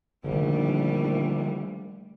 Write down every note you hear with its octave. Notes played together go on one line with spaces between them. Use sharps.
A#1 D3 D#3 F3 G3 A3